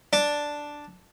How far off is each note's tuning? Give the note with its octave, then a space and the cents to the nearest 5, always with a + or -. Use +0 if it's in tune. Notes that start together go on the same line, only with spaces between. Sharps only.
D4 +0